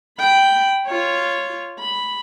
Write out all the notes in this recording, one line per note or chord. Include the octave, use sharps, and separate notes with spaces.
G5 B5
F4 C#5
B5